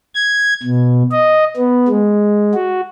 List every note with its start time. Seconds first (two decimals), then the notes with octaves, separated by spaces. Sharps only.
0.14 G#6
0.63 B2
1.11 D#5
1.57 B3
1.88 G#3
2.55 F#4